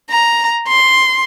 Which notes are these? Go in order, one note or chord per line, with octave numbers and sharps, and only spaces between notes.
A#5
C6